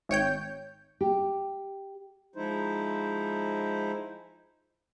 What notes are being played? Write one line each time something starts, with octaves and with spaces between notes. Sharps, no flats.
G#1 C#5 G5 G6
G4
F3 G#3 D#4 E4 C5